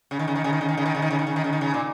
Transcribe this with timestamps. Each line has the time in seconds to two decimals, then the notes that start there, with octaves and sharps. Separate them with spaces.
0.11 C#3
0.19 D#3
0.28 C#3
0.36 D#3
0.44 C#3
0.53 D#3
0.61 C#3
0.68 D#3
0.77 C#3
0.86 D#3
0.95 C#3
1.02 D#3
1.10 C#3
1.19 D#3
1.27 C#3
1.36 D#3
1.44 C#3
1.53 D#3
1.61 C#3
1.74 A#2